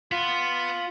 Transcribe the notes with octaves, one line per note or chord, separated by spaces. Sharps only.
B3 F4